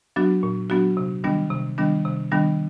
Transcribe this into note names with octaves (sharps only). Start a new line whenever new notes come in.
F#3 B3 D4 F#4
A#2
F#3 B3 D4 F#4
C3
D#3 G3 B3 D4
C3
D#3 G3 B3 D4
C3
D#3 G3 B3 D4